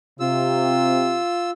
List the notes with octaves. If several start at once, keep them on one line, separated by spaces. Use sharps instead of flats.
C3 F4 E6